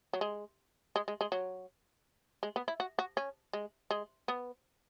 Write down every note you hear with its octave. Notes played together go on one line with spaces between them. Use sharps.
F#3
G#3
G#3
G#3
G#3
F#3
G#3
B3
E4
F#4
F#4
C#4
G#3
G#3
B3